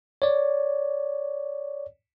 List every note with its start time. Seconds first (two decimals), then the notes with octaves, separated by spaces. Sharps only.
0.22 C#5 D5